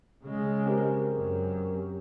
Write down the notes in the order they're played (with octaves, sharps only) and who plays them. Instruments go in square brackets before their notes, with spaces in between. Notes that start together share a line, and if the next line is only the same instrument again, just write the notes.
[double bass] C#3 G#3
[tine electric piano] C4 G4 A#4
[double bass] F#2